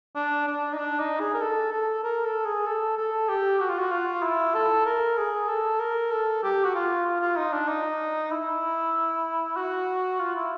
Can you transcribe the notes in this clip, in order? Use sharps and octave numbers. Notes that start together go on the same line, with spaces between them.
D4
D4
D#4
D4
D#4
G#4
A#4
A4
A4
A#4
A4
G#4
A4
A4
G4
F#4
F4
F#4
F4
E4
A4
A#4
G#4
A4
A#4
A4
G4
F#4
F4
F4
F4
D#4
D4
D#4
E4
F#4
F4
E4